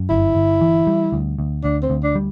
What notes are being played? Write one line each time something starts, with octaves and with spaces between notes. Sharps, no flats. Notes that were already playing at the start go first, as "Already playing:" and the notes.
Already playing: F#2
G1 E4
G1
E3
G3
D2
D2
D2 D4
C4
D2
D4
G3